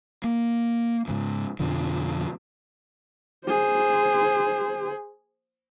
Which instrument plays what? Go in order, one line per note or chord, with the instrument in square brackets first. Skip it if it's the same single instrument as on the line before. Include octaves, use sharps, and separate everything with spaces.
[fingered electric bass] A#3
G#2 C#3 F3
F2 B2 D3 F3
[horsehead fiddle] G#4 C5